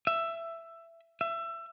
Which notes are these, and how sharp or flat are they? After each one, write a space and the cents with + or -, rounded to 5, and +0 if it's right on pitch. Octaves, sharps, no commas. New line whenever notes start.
E5 +15
E5 +25